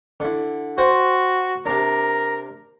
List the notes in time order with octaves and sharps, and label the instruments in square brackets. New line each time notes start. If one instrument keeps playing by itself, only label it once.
[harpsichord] D3 E4
[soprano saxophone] F#4 [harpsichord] C5 F#5 G5
[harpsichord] C3 D4 [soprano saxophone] A#4